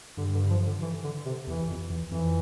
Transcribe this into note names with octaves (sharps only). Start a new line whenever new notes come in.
G2 D3
D3
F3
D3
E3
D3
C3
E2 E3
F2
E2
F2 E3